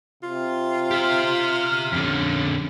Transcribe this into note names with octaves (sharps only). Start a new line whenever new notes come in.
C3 F4
G4 E5 F6
F2 D3 C#4